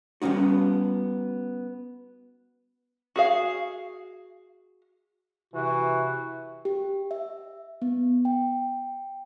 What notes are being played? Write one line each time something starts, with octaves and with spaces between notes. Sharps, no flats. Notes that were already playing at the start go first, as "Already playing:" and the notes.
G3 B3 C#4 D#4 F#4
F#4 G#4 F5
C3 E3 F#4
G4
E5
B3
G5